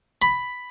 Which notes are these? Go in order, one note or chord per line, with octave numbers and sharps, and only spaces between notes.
B5